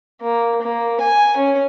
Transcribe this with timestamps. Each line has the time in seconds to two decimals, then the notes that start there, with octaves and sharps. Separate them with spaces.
0.21 A#3
0.61 A#3
1.00 G#5
1.37 C#4